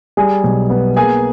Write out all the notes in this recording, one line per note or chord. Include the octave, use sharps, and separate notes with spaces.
G3 G#4 G#5
B1
B3
A#3 G#4 G#5